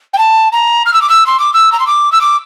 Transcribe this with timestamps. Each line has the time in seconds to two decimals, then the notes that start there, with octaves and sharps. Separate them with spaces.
0.13 G5
0.18 A5
0.52 A#5
0.86 F6
0.93 E6
1.01 D6
1.09 E6
1.26 C6
1.39 D6
1.53 E6
1.72 A#5
1.80 C6
1.87 D6
2.12 E6
2.21 D6